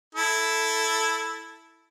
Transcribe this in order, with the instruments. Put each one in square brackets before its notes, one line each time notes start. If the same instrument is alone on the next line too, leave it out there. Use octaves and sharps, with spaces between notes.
[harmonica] E4 A4